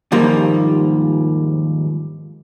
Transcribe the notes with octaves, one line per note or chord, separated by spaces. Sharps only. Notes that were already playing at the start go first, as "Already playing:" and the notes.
D#2 G#2 F3 G3 A#3